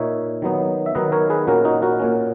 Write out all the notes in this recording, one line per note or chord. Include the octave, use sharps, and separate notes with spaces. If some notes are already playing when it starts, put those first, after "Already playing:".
Already playing: A#2 A#3 D#4 C#5 E5
D#3 F#3 B3 D#4
E5
D#3 F#3 B3 D#4 B4 D#5
A#4 C#5
G#4 B4
A#2 A#3 C#4 F#4 A#4
D#4 F#4
F#4 A#4
A#2 A#3 C#4